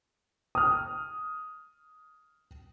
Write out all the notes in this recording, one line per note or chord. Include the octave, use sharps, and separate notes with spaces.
D#6 F6